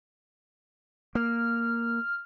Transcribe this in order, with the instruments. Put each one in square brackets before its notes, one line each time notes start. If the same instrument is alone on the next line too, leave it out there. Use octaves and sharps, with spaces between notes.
[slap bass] A#3 [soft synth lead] F6